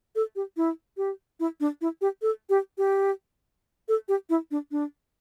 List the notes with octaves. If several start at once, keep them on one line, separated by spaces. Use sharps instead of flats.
A4
G4
E4
G4
E4
D4
E4
G4
A4
G4
G4
A4
G4
E4
D4
D4